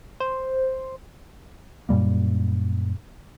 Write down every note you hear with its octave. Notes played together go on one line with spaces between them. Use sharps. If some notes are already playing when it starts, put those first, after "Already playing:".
C5
F#2 A#2 G3 A#3